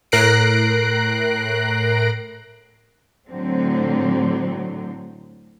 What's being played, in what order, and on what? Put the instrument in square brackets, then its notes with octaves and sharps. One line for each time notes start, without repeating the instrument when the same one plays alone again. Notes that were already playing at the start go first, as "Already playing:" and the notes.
[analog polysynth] A2 A#4 F#6 A#6 C7 D7
[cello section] A2 D3 F#3 C4